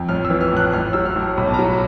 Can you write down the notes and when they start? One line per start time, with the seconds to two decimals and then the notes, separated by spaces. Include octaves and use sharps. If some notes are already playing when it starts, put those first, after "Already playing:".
Already playing: F2
0.09 A1 F6
0.25 E6
0.30 E3
0.41 F6
0.52 A2 F#6
0.73 A1 F6
0.93 F#3 E6
1.05 F6
1.16 A2
1.37 B1 B5
1.47 A5
1.54 F#3 A#5
1.70 B5